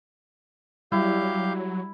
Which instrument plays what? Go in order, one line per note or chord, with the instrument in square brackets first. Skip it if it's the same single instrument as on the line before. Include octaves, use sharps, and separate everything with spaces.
[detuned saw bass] F#3 [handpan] G3 [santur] E4 [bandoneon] G4 F5 G6